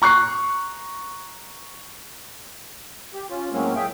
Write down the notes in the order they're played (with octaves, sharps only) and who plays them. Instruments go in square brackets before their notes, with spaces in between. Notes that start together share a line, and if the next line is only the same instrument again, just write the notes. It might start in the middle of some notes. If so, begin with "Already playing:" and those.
[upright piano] A#5 C#6 F#6 C7
[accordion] G4
C#4 F4
A2 F#3 G#3 A#3 C4 C#4
G#4 E5 G5